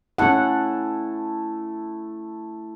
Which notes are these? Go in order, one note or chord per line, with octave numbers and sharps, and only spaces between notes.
A3 C#4 E4 A4 F#5